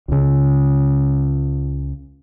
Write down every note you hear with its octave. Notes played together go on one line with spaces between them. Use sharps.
C#2 C#3